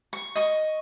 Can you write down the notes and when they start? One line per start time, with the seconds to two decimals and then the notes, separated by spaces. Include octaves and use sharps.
0.13 C#6
0.35 D#5 C#6